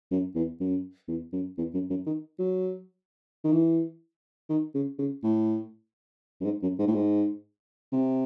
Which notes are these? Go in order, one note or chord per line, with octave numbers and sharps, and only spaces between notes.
F#2
E2
F#2
E2
F#2
E2
F#2
F#2
D#3
F#3
D#3
E3
D#3
C#3
C#3
A2
F#2
G#2
F#2
G#2
A2
G#2
C3